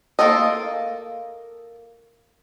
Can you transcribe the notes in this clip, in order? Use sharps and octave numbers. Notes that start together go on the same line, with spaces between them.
A#3 D4 F4 A4 D#5